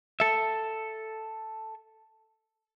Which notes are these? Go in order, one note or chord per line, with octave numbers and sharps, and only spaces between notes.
A4 E5